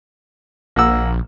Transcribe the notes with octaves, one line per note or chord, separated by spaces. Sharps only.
A#1 A#3 F#5 E6